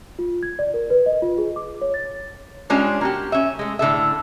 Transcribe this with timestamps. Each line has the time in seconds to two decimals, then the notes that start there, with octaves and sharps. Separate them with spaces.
0.19 F4
0.43 G#6
0.59 D5
0.74 A#4
0.90 B4
1.06 D#5
1.22 F4
1.38 G#4
1.56 D6
1.81 C#5
1.94 A6
2.70 G3 G#3 C#4 D4 F4
3.01 A#3 F#4 G4
3.32 C#4 E5
3.59 G#3 A3
3.79 A2 D3 A4 E5